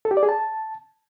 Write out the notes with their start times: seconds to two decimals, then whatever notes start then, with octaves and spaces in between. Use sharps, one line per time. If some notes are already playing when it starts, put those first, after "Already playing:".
0.05 A4
0.11 G4
0.17 D5
0.23 G#4
0.29 A5